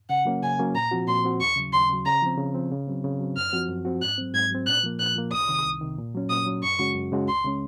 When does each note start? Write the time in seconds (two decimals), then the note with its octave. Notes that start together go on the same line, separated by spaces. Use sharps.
0.09 C#3 F#5
0.25 F#3 A#3 C#4
0.42 C#3 G#5
0.59 F#3 A#3 C#4
0.75 A#2 A#5
0.91 F3 C4 F#4
1.07 A#2 C6
1.24 F3 C4 F#4
1.40 D#2 C#6
1.56 C#3 F#3
1.72 D#2 C6
1.89 C#3 F#3
2.06 C#3 A#5
2.22 F3 C4
2.38 C#3
2.54 F3 C4
2.72 C#3
2.88 F#3 C4
3.04 C#3
3.20 F#3 C4
3.36 F#2 F6
3.53 F3 C4 F#4
3.69 F#2
3.85 F3 C4 F#4
4.01 G#2 F#6
4.18 F#3 C4
4.34 G#2 G#6
4.51 F#3 C4
4.67 A#2 F#6
4.84 F3 A#3
5.00 A#2 F#6
5.16 F3 A#3
5.33 C2 D#6
5.49 C3 D#3
5.65 C2
5.81 C3 D#3
5.98 A#2
6.14 F#3 C#4
6.30 A#2 D#6
6.46 F#3 C#4
6.63 F#2 C#6
6.79 C#3 G#3 C#4 F#4
6.95 F#2
7.12 C#3 G#3 C#4 F#4
7.28 C#2 C6
7.45 C#3 G#3 C#4